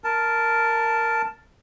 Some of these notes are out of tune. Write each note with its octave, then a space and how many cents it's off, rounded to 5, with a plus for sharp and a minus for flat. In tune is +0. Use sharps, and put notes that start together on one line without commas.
A#4 -5 A5 +0